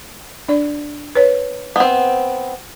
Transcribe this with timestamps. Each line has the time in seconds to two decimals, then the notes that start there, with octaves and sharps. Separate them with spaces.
0.48 D4 D5
1.15 B4 C#5
1.76 B3 C4